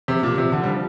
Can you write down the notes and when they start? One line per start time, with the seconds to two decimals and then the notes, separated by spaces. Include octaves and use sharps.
0.08 C3
0.23 A#2
0.38 C3
0.52 D3
0.63 G3
0.68 F3